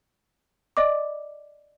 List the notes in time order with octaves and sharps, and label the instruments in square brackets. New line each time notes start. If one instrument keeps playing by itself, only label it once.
[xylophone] D5 D#5 D6